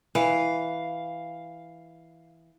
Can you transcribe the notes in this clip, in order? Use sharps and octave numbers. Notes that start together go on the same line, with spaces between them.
E3 F5